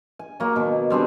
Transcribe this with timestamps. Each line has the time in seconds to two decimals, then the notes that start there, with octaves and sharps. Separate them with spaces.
0.19 G#5
0.40 F#3 A#3
0.56 B2 D#3
0.90 G3 C4 D4 G#4